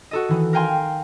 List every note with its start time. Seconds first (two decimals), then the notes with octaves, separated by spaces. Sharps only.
0.11 F#4 A4 D#5
0.28 D#3 E3
0.53 A#4 F5 G5 G#5 C6